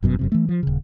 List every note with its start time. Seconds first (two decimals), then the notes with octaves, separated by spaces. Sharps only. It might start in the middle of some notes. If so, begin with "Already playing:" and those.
0.02 G1 F#2 B2
0.19 F1 F#2 C3
0.32 E3 A3
0.49 F3
0.63 D#1 C#3